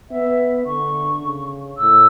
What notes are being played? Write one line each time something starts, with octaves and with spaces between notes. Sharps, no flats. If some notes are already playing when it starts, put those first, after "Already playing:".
B3 E5
D3 C#6
C#3
A2 E6